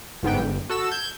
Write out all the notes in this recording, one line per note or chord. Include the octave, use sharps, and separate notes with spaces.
G1 G#2 B3 G5
G1
F#4 A4 E6 E7
G6 G#6